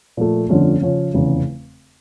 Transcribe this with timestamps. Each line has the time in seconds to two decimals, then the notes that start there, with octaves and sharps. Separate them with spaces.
0.17 A#2 F3 A3
0.49 G1 F2 D3 A3 C#4
0.81 C#3 F3 C#4
1.13 F1 E2 C#3